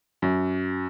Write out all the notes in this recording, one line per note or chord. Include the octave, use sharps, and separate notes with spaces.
F#2